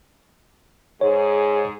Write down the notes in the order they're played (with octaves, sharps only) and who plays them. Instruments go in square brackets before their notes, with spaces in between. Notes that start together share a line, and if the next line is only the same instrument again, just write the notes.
[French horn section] G#2 G#4 [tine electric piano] C#5